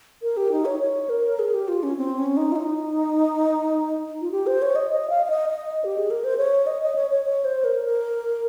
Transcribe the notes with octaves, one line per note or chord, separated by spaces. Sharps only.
A#4
G4
D#4
C#5
C#5
A#4
G#4
G4
F4
C#4
C4
C#4
D#4
F4
D#4
F4
G4
C5
C#5
D#5
D#5
F5
F5
D#5
D#5
G4
G#4
A#4
C5
C#5
D#5
D#5
C#5
C#5
C#5
C5
A#4
A#4